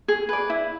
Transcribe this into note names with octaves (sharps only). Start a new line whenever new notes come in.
G#4
B4 D5
E4